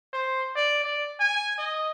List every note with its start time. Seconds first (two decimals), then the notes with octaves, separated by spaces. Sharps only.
0.13 C5
0.56 D5
0.84 D5
1.20 G#5
1.58 D#5